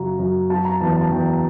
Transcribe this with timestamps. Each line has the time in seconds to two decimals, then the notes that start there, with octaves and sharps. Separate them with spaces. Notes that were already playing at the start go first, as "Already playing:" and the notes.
Already playing: F#2 C#3 F#3 A#5
0.19 F#2
0.50 F#3 A5
0.65 A#5
0.81 E2 A5
0.97 A5
1.12 E2 G5